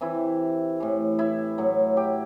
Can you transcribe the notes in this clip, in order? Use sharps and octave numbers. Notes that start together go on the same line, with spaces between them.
C3 E3 E4
A2 E3
E4
A2 F#3
G4